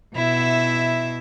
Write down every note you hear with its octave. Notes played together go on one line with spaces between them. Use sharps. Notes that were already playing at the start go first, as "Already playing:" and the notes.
B2 E4 E5